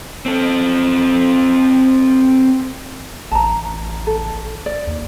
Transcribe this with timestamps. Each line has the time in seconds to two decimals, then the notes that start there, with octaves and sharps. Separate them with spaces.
0.26 C4 A4
3.31 A1 A5 A#5
4.07 A4
4.66 D5
4.87 D#2